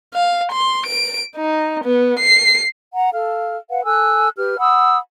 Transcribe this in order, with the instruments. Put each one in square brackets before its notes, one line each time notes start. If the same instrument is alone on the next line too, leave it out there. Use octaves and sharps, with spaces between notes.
[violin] F5
C6
D7
D#4
B3
C7
[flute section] F#5 A#5
A4 F5 F6
B4 F5 F#5
A4 G#5 E6 F#6
G4 B4 F6
F#5 B5 D#6 E6